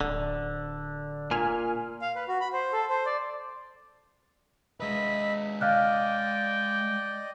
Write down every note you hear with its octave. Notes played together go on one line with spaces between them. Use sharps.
D1 D3
A#2 G#5 F6
F5
B4
F#4
B5
C5
A4
C5
D5
G#3 B4 D#5 E5 B5
D5 D#5 F5 G5 F6 F#6